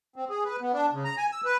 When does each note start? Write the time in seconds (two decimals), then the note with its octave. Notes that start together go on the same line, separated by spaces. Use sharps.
0.16 C4
0.30 G#4
0.45 B4
0.61 B3
0.73 D4
0.93 C#3
1.05 A#5
1.17 G#5
1.31 E6
1.45 B4